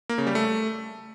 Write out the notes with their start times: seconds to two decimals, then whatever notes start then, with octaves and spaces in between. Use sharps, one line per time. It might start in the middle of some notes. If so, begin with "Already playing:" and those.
0.09 A#3
0.18 C#3
0.27 G3
0.35 A3